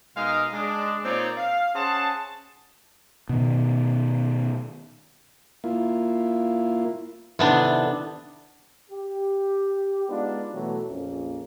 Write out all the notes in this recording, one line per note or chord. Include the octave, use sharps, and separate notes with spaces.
B2 G#3 D#4 A#4 D#5 F5
G#3 D4
A#2 A#3 C4 D#4 C#5 D5
F5
C#4 G#4 C5 F#5 A5
B2 D#3
A#3 E4 F4
C3 D#3 B3 D4 E4 A4
G4
G#3 B3 D4 D#4 F4
B2 E3 F#3 A3
A#1 F2 A#3 C#4